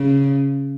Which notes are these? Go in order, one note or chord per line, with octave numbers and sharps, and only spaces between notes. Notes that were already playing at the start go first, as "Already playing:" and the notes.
Already playing: C#3